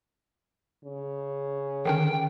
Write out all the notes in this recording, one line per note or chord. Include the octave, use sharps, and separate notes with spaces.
C#3
D3 D#3 C#4 G5